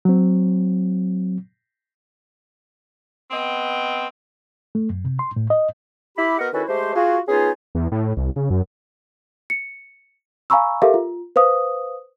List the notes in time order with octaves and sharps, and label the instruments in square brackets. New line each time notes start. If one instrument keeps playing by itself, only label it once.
[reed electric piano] F#3 C4
[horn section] B3 C4 D#5 G5
[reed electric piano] A3
F#2
C3
C6
A2
D#5
[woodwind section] E4 G4 B5
B3 F#4 A#4 D#5 F#5
D#3 C#4 E4 F#4 A4 B4
G#3 A3 G4 C5
F4 F#4 G#4
B3 C#4 D#4 F4 G#4
[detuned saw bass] E2
A2
C2
C#3
F#2
[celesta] C#7
F5 G#5 A#5 B5 C#6 E6
G4 A4 A#4 E5 F5
F4
B4 C5 F5 D#6